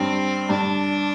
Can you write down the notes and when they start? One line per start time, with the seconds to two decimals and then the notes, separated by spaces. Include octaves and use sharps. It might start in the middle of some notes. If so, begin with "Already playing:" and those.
Already playing: G2 C4
0.49 G2 D4